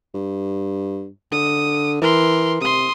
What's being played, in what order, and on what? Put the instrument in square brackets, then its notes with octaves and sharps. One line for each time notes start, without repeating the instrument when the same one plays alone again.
[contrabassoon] G2
[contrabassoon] D3 [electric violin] D#6
[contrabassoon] E3 [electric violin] A#4 C6
[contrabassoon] C3 [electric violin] C6 D#6